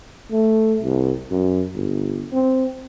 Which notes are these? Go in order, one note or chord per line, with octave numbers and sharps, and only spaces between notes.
A3
C2
F#2
G1
C4